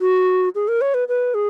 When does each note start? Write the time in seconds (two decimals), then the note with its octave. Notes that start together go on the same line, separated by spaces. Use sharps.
0.01 F#4
0.55 G#4
0.68 A#4
0.81 C#5
0.94 B4
1.08 B4
1.34 G#4